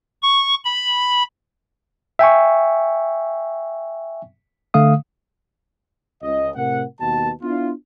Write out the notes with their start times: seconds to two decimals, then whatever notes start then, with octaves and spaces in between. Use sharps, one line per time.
0.22 C#6
0.65 B5
2.19 E5 G5 G#5 C#6
4.74 D3 A3 F5 D#6
6.22 C#2 D#5
6.56 A2 C3 A#4 F#5
7.01 D#2 B2 A5
7.42 B3 D4 E4 F4